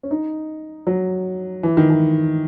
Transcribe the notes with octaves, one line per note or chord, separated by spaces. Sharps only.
C#4
D#4
F#3
E3
D#3
E3